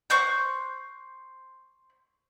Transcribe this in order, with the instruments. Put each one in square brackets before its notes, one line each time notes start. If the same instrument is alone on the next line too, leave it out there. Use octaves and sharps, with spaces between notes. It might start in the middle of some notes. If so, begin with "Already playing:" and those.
[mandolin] C5 C#6 F#6 G6